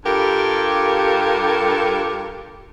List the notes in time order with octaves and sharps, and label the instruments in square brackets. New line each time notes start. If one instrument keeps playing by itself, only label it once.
[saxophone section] G2 F4 G4 A4 A#4